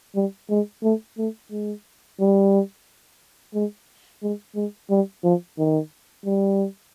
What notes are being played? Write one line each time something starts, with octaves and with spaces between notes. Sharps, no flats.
G3
G#3
A3
A3
G#3
G3
G#3
G#3
G#3
G3
F3
D#3
G3